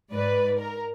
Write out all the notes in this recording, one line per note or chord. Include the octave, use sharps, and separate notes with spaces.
G#2 B4 D5
A#4